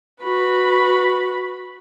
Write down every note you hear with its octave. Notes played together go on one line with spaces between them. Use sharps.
F#4 B4 B5